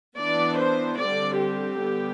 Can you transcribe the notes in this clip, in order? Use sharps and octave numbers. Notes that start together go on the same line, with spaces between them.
E3 B3 D4 D5
C5
D3 G3 C4 D5
G4
D3 G3 B3